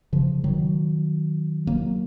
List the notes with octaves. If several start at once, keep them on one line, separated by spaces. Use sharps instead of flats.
C#3 F3
D#3 F#3
F#3 A#3